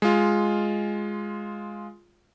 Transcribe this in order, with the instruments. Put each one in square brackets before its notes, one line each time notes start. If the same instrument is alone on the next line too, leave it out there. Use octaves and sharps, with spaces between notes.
[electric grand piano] G#3 F4